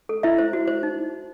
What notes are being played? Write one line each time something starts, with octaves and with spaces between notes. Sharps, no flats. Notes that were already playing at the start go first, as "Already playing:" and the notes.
A4
E4 E5
C5
F#4
C5
D#4